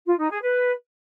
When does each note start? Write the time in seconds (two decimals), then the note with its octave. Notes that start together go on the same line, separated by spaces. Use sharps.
0.06 F4
0.18 D#4
0.30 G#4
0.42 B4